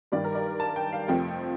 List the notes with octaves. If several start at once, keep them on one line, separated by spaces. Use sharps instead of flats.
G2 D#3 G3 D5
A#4
D5
A5
G5
F5
F2 C3 F3 A3 C4 G5